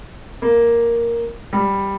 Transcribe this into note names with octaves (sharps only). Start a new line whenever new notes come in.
A#3
G3